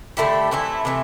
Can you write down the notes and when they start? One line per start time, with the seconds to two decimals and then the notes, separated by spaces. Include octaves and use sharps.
0.17 D3 A3 E4 G4
0.51 C3 E3 A3 E4
0.85 C3 E3 A3